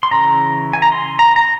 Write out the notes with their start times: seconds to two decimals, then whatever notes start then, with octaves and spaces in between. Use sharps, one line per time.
0.03 C6
0.11 C#3 E3 A#5
0.73 G#5
0.82 A#5
0.92 C6
1.19 A#5
1.36 A#5